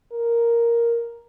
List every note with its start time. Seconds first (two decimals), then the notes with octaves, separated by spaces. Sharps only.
0.12 A#4